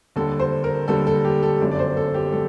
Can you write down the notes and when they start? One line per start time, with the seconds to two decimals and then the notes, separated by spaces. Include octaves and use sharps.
0.16 D#2 D3 G3 A4
0.40 C5
0.64 A#4
0.88 D#2 D3 G3 A4
1.07 A4
1.25 G4
1.43 A4
1.60 G1 F#2 D3 F#3 D5
1.71 D5
1.79 C5
1.97 A4
2.14 G4
2.32 F#3 A4